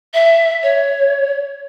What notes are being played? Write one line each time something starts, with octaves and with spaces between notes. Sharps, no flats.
E5
C#5